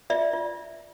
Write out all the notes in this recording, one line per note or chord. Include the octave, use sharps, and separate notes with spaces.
F4 D5 E5
F4